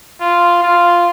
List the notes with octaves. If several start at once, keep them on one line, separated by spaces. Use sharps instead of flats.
F4
F4